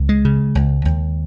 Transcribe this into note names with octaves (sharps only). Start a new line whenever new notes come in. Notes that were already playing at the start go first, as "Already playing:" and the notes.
Already playing: C#2
G#3
C#3
C#2
D#2